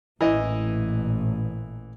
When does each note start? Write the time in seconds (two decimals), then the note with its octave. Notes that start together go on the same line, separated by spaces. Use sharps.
0.21 A1 A#2 E3 D#5